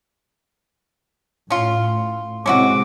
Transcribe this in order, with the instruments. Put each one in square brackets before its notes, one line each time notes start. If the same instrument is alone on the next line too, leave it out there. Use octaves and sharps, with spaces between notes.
[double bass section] A2 [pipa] C#4 F4
[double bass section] C3 G#3 C4 [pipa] C#4 E4 F#4 [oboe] D6